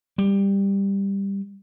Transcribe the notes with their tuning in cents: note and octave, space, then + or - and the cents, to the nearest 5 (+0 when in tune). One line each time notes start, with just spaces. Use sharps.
G3 +10